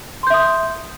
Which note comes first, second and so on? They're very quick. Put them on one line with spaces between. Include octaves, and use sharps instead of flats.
C6 G6 E5 D#6